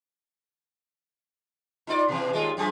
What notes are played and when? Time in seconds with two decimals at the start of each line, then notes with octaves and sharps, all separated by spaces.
1.87 D#4 F4 D5
2.08 B2 E3
2.33 D#2 G#3 F4
2.57 F#2 F3 G#4